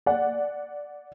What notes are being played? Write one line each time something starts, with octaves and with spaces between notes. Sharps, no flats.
D5 F#5